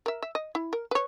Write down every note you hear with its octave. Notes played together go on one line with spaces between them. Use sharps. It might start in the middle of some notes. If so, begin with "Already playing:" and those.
A#4 E5
E5
D#5
E4
A#4
B4 C#5